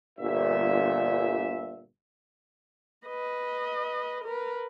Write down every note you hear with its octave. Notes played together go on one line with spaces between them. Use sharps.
G1 A#2 E5
B4 D#5
A#4 B4